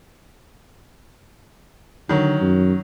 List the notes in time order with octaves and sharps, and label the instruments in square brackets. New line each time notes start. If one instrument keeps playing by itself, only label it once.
[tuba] D3 [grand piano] D#3 F#3
[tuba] F#2